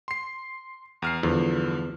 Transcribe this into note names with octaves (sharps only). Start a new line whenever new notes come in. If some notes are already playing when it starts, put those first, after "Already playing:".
C6 C7
E2 F6 C7
E2 G2 D3 F3